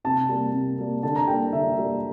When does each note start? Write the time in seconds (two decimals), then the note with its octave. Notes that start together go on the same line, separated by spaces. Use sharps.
0.04 C3 A5
0.29 G3 A#3
0.54 C3
0.79 G3 A#3
1.03 D3 A5
1.16 A#5
1.27 G3 A#3 G5
1.53 D3 E5
1.77 G3 A#3